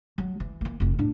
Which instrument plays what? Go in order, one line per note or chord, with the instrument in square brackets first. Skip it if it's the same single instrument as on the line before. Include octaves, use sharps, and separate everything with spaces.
[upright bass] F#3
E3
E3 A#3
F1 E3
A2 D4